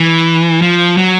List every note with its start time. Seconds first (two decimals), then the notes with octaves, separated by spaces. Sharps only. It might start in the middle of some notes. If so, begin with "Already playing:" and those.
Already playing: E3
0.62 F3
0.97 F#3